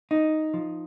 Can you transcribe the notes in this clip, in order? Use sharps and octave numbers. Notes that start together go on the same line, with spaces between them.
D#4
F3